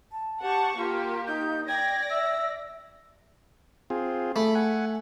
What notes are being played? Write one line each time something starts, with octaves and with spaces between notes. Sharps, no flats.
A5
G4 F#5 A5 C#6
A#3 F4 G4
D#4 G6
D5 G5 G#6 A#6
E5 E6
C4 F4 G#4
A3 B5
F#5 G#5